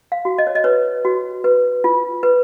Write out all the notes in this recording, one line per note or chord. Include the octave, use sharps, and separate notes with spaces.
F5
F#4
D#5
C#5
D#5
B4 C#5
F#4
B4
F4
B4